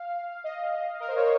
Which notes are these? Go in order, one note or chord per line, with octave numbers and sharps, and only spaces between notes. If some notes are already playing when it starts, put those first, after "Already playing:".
Already playing: F5
D#5
A#4
C5
C#5